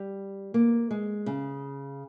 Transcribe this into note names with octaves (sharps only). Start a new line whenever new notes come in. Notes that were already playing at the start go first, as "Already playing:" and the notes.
Already playing: G3
A#3
G#3
C#3